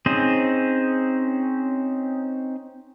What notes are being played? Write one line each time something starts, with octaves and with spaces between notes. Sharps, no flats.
C4 C#4 D#4 G#4 C5